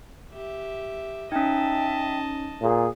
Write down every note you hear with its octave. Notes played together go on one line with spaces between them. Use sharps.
G4 E5
C#4 D#4 D#5 E5 G5 A5
A#2 G#4